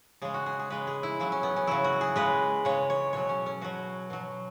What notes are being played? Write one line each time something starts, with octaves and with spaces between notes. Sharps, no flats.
C#3 G#3 G#4
F#4
G#4
G#4
C#3 G#3 B4
G#4
E4
C#3 F#3 E4
C#4
B3
C#4
C#3 F#3 E4
F#4
G#4
C#3 G#3 B4
C#3 G#3 C#5
C#5
B2 F#3 C#5
C#4
C#4
B2 F#3 F#4
B2 F#3